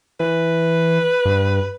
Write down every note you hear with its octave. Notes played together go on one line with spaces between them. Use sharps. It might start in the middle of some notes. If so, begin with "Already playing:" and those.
E3 B4
G2